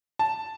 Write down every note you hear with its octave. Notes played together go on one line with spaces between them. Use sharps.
A5